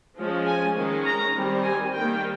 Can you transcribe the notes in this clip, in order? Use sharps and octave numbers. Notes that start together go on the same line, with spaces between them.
F3 G#3 C#4
G#5
D#3 G#3 C#4
A#5
D#3 G3 C4
G#5
D#3 G3 A#3 G5